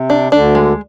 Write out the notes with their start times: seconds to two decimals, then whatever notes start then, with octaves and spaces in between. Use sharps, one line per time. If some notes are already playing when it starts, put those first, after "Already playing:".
Already playing: C3
0.10 D4
0.32 D2 D3 D4
0.55 G#3